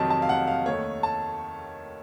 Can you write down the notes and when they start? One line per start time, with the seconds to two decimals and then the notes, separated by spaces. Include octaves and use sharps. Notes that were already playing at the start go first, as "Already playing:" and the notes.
Already playing: F2 C3 D#3 F#3 A5
0.10 A5
0.22 F5
0.29 F#5
0.48 F5
0.66 D#2 D#3 A3 C#5
1.03 A5